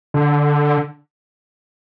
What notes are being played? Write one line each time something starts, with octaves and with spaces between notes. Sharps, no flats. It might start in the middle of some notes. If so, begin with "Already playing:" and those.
D3